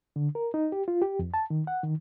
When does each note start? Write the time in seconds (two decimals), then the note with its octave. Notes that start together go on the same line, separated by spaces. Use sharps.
0.16 D3
0.35 A#4
0.54 D#4
0.72 G4
0.88 F4
1.02 G4
1.19 F2
1.34 A5
1.50 D#3
1.67 F#5
1.83 D#3